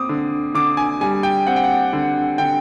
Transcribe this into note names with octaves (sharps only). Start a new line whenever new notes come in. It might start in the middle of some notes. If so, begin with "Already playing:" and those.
Already playing: C4 D6 D#6
D3
D3 D6
G#5
G3 G#5
G5
C4 F#5
G5
F#5
D3
D3 G5